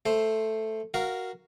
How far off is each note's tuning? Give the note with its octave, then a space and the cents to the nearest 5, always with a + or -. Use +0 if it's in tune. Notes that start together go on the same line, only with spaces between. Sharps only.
A3 +0 C5 +5
F#4 +0 A#4 +0 F5 -10